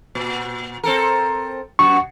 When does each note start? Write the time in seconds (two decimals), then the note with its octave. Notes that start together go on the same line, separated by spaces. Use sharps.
0.15 A#2
0.83 C4 A4 A#4
1.79 F#2 B3 F#4 C#6